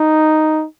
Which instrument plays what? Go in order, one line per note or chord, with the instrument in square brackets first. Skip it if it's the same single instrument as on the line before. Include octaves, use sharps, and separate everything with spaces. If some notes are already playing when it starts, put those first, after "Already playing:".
Already playing: [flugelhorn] D#4